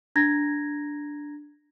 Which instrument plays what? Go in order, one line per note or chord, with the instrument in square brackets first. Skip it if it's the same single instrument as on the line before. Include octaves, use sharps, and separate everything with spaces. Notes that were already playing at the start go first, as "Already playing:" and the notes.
[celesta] D4 A#5 G#6 A#6